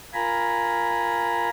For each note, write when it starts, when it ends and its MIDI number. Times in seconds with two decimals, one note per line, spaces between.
0.14 1.49 65
0.14 1.49 70
0.14 1.49 80
0.14 1.49 82
0.14 1.49 83